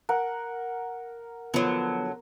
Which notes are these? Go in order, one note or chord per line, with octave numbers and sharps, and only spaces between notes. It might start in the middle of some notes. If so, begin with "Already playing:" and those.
A#4 F#5
D3 F3 F#3 B3